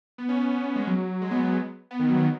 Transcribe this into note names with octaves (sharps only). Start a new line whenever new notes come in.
B3
C#4
B3
B3
G#3
F#3
G#3
B3
B3
D#3
F#3
D#3